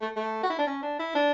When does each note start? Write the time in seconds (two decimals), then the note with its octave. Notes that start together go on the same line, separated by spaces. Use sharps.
0.01 A3
0.16 A3
0.43 F#4
0.50 E4
0.58 D4
0.67 C#4
0.82 D4
0.99 E4
1.15 D4